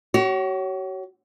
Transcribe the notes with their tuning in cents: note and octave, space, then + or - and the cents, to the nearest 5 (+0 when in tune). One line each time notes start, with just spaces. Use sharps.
F#4 +40 C#5 +0